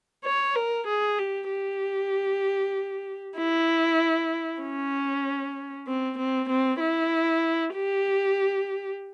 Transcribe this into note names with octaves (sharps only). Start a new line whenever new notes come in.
C#5
A#4
G#4
G4
G4
E4
C#4
C4
C4
C4
E4
G4